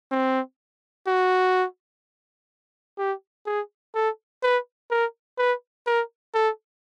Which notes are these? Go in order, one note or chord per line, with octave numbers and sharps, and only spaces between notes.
C4
F#4
G4
G#4
A4
B4
A#4
B4
A#4
A4